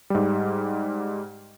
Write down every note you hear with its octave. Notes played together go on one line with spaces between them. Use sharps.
G#2 G3